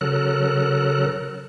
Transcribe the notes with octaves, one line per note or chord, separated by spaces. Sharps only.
C#3 F#3 A4 A#4 F#6